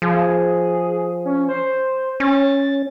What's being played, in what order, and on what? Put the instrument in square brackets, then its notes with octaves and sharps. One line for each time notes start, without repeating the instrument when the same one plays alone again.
[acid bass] F3 [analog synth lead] G#4
[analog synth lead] C#4
C5
[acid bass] C#4 [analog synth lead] A6